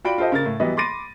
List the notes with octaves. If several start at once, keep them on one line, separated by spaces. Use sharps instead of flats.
F4 F#4 D5 G5 B5 D7
F4 G4 A4 C5 D#5
C#3 A#4 A6
A2
E3 F#3 G3 B3 B4 D#5
B5 C6 D6 A6 A#6 D#7